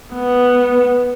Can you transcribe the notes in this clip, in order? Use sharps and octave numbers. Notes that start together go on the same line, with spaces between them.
B3